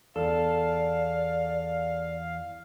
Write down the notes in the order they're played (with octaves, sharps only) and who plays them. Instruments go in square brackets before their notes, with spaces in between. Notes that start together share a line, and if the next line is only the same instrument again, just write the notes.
[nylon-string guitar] E2 [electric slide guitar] A4 [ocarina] D5 [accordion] F5